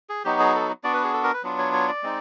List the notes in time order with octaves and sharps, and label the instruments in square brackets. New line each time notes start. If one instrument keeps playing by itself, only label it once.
[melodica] G#4
F#3 B3 D#4 F#4 G4
G#4
A4
B3 D4 F#4 D5
B4
G#4
A4
A#4
B4
F#3 B3 D4 F4
C#5
C#5
D5
G#3 C4 D#4